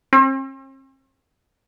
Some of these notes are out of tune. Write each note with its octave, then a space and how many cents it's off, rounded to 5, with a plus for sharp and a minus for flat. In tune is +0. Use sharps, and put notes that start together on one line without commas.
C4 +45